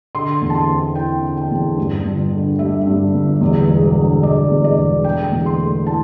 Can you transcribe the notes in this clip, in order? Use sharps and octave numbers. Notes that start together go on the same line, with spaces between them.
D3 C6
E2
A5
C6
C4
E4 G5
D3
G5
E2
G2
G1
D3
G3 E5
G2
G1
E2
E1
D3
E1 D5
E2
D5
E1
D3 G5
E2
C6
A3
E4 A5